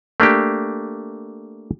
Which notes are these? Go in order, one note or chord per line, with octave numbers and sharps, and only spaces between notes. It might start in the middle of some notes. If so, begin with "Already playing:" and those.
A3 A#3 D4 G4